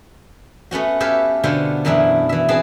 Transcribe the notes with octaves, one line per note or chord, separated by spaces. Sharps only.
A3 B3 C#4 F#4
G4 A4 B4 C#5 E5 F5
B2 D3 B3 F4 A4 C5
F#2 B2 E3 D4 E4
E3 E5
B3 C4 G#4 B4 A5